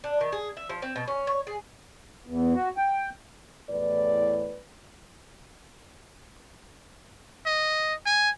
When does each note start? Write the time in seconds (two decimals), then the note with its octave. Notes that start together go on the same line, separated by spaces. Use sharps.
0.04 D4
0.21 D#3
0.32 G#4
0.57 E5
0.69 F3
0.82 C4
0.96 B2
1.08 C#4
1.27 C#5
1.47 G#4
2.27 E2
2.55 F#4
2.77 G5
3.69 E2 A2 B4 D5
7.46 D#5
8.06 G#5